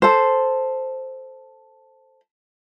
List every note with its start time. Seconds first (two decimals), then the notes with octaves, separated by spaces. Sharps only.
0.02 A4 C5